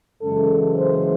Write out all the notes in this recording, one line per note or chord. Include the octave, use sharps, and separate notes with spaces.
F#2 C#3 E3 G#3 A4
C5